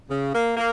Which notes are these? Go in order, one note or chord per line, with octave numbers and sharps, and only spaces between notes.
C#3
A#3
A#3